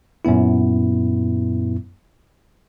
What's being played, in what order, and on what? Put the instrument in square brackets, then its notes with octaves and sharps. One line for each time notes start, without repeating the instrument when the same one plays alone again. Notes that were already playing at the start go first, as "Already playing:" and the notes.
[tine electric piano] F#2 A#2 B3 E4